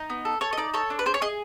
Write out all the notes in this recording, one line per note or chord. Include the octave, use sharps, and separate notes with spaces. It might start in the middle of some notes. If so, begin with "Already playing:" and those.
Already playing: D#4
B3
A4
A4 C#5
D#5
D#4 D5
A4 C#5
D4
B4
G#4 C5
C#5
G#4 D#5